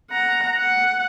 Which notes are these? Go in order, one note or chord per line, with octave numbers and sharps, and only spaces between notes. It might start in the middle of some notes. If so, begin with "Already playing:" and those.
F#5 A#5
F#5